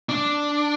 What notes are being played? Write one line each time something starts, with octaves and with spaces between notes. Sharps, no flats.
D4